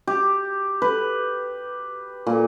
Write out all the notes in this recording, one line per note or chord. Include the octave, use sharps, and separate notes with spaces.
G4
B4
A#2